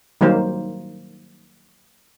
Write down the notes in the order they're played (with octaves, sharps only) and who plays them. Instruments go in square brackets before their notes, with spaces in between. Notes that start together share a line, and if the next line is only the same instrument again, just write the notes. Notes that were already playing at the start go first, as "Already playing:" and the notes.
[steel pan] D#3 F#3 G3 A#3 C5